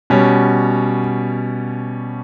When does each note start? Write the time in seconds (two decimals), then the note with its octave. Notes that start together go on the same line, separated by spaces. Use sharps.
0.10 B2 G3 C#4